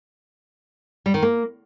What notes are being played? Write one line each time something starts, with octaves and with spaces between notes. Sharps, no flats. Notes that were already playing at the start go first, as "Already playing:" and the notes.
G3
D#3
A#3